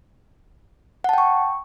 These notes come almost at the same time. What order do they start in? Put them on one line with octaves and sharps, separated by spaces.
F#5 A5 G5 C#6